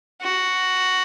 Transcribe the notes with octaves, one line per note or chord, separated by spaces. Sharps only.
F#4